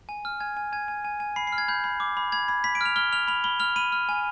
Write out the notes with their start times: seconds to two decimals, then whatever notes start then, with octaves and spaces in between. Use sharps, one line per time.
0.09 G#5
0.25 F6
0.40 G#5 G#6
0.57 G#5
0.73 G#5 G#6
0.88 G#5
1.05 G#5
1.20 G#5
1.36 B5 C7
1.47 C7
1.53 F6
1.58 G#6
1.68 B5 G6
1.84 B5
2.00 D6
2.17 B5
2.32 B5 G#6
2.48 B5 G#6
2.64 B5 B6
2.75 D7
2.81 F6 F7
2.96 F6 G7
3.12 F6 F7
3.28 B5 F7
3.44 B5 G7
3.60 F6 F7
3.76 B5 D#7
3.92 F6
4.09 G#5